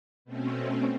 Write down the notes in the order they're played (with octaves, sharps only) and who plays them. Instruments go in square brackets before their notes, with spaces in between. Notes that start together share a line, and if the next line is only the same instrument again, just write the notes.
[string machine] B2 A3 C4 C#4